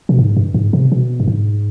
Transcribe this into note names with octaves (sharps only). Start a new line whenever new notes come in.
B2
G#2
G2
G#2
C3
B2
G2
G#2